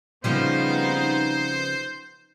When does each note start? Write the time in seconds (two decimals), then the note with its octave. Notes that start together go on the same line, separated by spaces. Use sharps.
0.24 C#3 F3 G3 B3 C4 D#4 C5